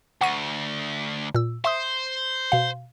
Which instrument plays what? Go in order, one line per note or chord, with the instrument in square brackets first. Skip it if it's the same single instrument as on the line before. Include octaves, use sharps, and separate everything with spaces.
[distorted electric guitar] D2 [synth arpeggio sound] F#5 C#6 D#7
[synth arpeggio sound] A#2 E6
[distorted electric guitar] C5 [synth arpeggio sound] E5 C6 D#6
[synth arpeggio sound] B2 F5